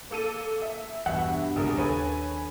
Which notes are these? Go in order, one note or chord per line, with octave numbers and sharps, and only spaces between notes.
A#3 A4 D#7
E5
E2 G2 B2 E5 F#5
A#1 C#3 G#3 C4 A#4 D#6
D#2 C#4 A4 B4 G#5